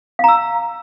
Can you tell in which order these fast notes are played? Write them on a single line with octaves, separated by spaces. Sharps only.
F5 A#5 E6